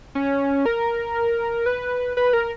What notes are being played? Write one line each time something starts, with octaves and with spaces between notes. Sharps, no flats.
C#4
A#4
B4
B4
A#4